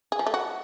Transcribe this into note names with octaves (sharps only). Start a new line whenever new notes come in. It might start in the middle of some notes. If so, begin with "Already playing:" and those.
G#4
F3
A3
F#4